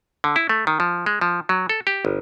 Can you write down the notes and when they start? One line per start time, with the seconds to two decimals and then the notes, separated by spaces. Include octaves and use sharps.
0.24 D3
0.36 E4
0.49 A3
0.67 D#3
0.80 F3
1.06 G#3
1.21 F3
1.49 F#3
1.69 A4
1.87 G4
2.05 G1